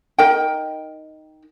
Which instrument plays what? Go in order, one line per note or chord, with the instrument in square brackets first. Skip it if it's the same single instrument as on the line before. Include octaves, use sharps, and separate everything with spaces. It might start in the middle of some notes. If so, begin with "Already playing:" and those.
[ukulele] D#4 A#4 D#5 G5